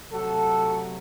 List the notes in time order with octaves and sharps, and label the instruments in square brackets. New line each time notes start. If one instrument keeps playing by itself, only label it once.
[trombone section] C3 F#3 A3 F#4 A4